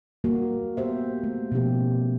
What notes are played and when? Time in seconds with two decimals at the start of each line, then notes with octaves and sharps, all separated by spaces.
0.24 G3 A#3 F#4
0.77 B3 G4 C5 E5
1.23 A3
1.52 B2 F3 C#4 E4 G4